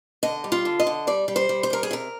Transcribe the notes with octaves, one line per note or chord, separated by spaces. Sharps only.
D3 D#5
G3
F4
D3
D#5
D3
G3 D5
G3
C5
G3
C5
G3 A#4
G#4
C3 A#4